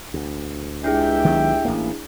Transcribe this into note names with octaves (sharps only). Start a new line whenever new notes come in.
D2
C#2 D4 E4 G4 G#4 E5 G5
D#3 F#3 B3
A1 A#3